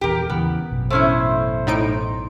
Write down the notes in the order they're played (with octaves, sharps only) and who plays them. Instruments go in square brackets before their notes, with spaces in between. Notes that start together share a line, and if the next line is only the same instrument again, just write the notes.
[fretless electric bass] D#1 A#1 E2 [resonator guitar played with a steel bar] G4 A#4
[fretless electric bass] E2 C#3 E3 [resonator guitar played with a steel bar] B3
[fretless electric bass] A1 F#2 B2
[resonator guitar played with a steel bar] A3 C#4 E4 [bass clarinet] C5
[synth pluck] A2 D#4 D7